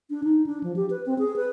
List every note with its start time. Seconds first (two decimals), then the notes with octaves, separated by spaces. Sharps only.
0.10 D4
0.23 D#4
0.46 D4
0.63 F3
0.76 G4
0.90 B4
1.06 C4
1.19 G#4
1.36 B4